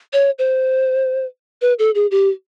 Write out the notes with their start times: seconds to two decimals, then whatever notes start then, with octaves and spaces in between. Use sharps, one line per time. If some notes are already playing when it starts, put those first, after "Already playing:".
0.13 C#5
0.39 C5
1.62 B4
1.79 A4
1.95 G#4
2.11 G4